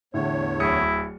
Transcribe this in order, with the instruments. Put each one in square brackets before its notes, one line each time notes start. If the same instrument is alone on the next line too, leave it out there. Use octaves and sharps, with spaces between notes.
[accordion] E2 C#5 [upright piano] A2 D3
[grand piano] D1 D#6 C#7 [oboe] E4